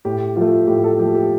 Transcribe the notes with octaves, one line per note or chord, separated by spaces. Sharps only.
A2 G4
F3 A3 F4
A2 G4
A4
F3 A3 G4
G4